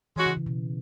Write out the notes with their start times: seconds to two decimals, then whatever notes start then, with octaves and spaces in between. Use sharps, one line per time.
0.16 E3 G#3 C#4 F#4
0.26 C#3
0.37 C#3
0.46 B2